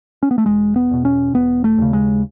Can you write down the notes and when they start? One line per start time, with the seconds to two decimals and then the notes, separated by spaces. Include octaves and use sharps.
0.23 C#4
0.31 B3
0.38 A3
0.46 E1 G#3
0.76 B3
0.91 E2 B2
1.05 C#4
1.34 E1 B3
1.64 A3
1.78 D#2 C#3
1.93 G#3